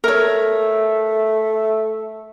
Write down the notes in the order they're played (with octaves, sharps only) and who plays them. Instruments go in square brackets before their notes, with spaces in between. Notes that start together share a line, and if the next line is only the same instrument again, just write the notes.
[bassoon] A3 [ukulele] A#4 C#5 [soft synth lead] E5